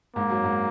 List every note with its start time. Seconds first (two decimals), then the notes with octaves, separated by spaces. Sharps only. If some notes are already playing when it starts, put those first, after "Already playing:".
0.15 G#2 A#3
0.30 F#2
0.44 G#2